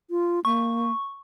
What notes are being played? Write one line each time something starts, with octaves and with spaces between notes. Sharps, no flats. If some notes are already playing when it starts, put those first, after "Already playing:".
F4
A#3 C#6